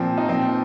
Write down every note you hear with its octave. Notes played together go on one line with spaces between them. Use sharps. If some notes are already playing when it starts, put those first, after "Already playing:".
Already playing: A#2 F3 C4
D#4
A#2 F3 C4